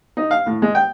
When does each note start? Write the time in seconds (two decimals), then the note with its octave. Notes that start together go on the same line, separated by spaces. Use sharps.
0.17 D#4
0.31 F5
0.46 A2
0.62 G#3
0.75 G5